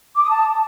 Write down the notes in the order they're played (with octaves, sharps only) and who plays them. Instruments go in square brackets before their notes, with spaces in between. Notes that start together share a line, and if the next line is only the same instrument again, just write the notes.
[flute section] D6
D#6
A5